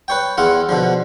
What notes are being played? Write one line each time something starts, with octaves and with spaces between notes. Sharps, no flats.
B4 C#5 G5
E2 E4 F4 F#5
B2 D3 F3